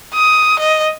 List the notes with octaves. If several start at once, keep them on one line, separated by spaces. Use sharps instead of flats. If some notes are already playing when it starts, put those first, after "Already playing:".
D#6
D#5